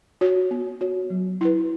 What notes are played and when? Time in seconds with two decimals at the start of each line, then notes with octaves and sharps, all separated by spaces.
0.21 F#4 C#5
0.51 B3
0.81 F#4 C#5
1.10 F#3
1.41 E4 B4